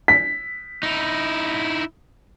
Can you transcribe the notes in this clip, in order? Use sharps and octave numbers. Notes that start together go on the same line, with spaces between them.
B6
D#4 E4